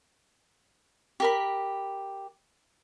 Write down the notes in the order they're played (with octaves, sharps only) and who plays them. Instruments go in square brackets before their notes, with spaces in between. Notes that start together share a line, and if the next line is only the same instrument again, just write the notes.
[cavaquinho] G4 A#4 B5